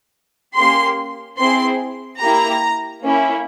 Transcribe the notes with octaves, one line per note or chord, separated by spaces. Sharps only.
A#3 C#4 G4 C6
C4 E4 G#4 C6
A#3 E4 G4 A#5
A#3 C#4 E4